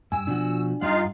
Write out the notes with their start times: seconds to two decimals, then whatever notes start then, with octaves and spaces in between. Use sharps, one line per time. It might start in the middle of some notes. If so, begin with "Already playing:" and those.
0.12 G2 G#5 E6
0.27 B2 F3 D4 F#4
0.81 G2 G3 D#4 F4 F5 F#5